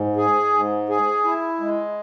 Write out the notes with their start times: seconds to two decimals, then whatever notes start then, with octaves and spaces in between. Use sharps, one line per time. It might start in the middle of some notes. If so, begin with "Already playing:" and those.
Already playing: G#2
0.16 G#4
0.53 G#2
0.89 G#4
1.25 E4
1.60 G#3